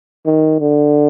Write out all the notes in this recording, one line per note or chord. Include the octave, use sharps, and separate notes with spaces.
D#3
D3